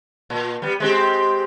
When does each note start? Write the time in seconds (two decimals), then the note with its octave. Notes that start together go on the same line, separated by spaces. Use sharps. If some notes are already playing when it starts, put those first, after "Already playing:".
0.30 A#2
0.62 G3 B3
0.80 G#3 C4 G4